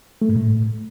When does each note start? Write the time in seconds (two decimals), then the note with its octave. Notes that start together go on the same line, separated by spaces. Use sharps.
0.22 A3
0.29 G#2
0.36 A2